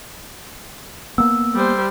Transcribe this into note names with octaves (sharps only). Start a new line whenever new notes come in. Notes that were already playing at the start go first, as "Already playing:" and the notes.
A#3 B3 E6
G3 C5